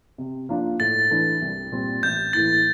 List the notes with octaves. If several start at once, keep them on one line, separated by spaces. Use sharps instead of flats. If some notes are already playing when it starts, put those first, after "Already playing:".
C3
F3 A#3 D4 F4
A2 A6
E3 A3 D4
C2
A#2 G3 C4
A1 G6
A2 E3 A#3 E4 A6